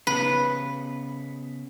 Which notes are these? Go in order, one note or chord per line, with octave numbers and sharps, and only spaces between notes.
C#3 B3 B4